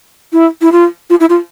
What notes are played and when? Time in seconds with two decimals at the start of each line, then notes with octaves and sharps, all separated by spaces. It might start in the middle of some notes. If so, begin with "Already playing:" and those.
0.33 E4
0.62 E4
0.72 F4
1.10 F4
1.20 E4
1.30 F4